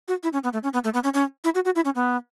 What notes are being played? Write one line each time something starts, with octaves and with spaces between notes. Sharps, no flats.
F#4
E4
C#4
B3
A3
C#4
B3
A3
B3
C#4
C#4
E4
F#4
F#4
E4
C#4
B3